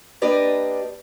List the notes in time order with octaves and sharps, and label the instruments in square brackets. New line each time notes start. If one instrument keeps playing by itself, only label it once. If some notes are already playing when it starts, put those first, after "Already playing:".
[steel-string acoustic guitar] A#3 D4 G4 B4 D5 D#5